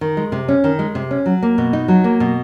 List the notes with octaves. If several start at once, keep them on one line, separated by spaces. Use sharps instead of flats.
D#3
G#3
C3
C#4
D#3
G#3
C3
C#4
F#3
A#3
B2
D#4
F#3
A#3
B2